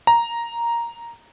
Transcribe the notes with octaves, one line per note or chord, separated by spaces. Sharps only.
A#5